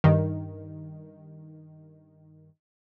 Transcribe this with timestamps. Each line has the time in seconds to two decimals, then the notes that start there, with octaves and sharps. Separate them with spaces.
0.04 G2 D#3